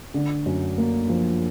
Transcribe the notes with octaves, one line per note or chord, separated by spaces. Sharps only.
D3
F#2
A#3
F3